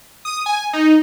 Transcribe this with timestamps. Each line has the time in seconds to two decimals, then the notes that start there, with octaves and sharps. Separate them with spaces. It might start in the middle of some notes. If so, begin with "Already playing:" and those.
0.25 D#6
0.46 G#5
0.73 D#4